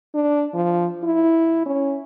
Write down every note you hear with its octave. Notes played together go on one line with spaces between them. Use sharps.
D4
F3
E4
C#4